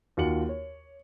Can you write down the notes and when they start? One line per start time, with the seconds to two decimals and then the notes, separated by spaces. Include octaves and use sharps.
0.17 D#2 F4 F#4 C#7 F#7
0.49 C#5